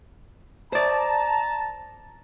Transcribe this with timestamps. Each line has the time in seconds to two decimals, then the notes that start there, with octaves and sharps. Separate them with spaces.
0.73 C5 D5 A5 A#5